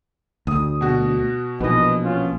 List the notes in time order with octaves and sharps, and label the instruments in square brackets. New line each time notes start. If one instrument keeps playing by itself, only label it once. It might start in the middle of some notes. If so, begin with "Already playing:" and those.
[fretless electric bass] D2 [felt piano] D#6
[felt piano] B2 F#4
[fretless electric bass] A#1 [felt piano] B2 E3 [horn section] B4 D#5
[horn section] B3 C#4 F4